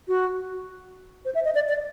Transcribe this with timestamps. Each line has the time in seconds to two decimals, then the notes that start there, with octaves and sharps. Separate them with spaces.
0.08 F#4
1.25 C5
1.35 E5
1.45 D#5
1.55 D5
1.69 D5